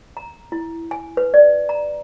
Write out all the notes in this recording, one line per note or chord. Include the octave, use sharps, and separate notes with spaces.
A#5
E4
G#5
B4
D5
A#5